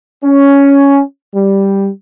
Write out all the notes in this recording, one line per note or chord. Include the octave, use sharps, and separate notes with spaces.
C#4
G3